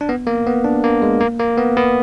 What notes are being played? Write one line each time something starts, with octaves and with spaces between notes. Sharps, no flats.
D4
B3
A#3
B3
D4
A#3
G#3
A#3
A#3
B3
B3